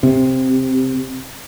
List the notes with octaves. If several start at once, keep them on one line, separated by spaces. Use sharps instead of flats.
C3